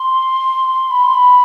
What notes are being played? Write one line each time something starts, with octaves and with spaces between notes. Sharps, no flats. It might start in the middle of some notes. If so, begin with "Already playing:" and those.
Already playing: C6
B5
C6
B5